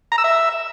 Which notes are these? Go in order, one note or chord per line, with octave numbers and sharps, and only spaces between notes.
A#5
E6
E5